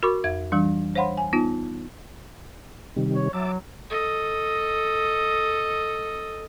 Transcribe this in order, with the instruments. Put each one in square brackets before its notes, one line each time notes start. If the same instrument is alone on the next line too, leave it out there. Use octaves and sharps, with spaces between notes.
[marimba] F#4 A#4 B5 C#6 D6
F2 E5 G#6
E3 G3 D4
C5 C#5 F5 F#5 B5 C6
G#5
B3 D#4 F4
[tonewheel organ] C3 D#3 G3
[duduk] C#5
[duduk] F#3 [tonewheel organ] E5 A5 D6
[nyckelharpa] A4 D#5